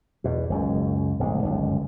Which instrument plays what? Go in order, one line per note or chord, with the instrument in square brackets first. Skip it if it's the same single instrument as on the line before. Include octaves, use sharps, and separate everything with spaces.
[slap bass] E2 B2
F#1 C#2 F#2
D1 B1 G3 G#3
G1 C#2 F#2